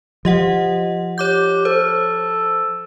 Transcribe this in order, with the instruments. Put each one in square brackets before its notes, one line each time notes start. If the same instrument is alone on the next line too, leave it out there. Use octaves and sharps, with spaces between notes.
[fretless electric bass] F3 [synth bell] G4 D#5 F#5
[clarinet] G4 [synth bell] C#5 D6 G6
[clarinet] A4 [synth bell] C5